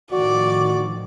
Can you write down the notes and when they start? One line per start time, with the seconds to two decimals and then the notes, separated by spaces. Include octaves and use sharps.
0.12 A2 D#3 F3 F#4 D5 D6